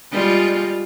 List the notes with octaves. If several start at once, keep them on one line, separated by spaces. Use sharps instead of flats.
G3 G#3 F4